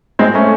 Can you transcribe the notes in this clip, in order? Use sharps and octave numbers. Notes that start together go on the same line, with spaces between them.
G#3 C4
A3 C#4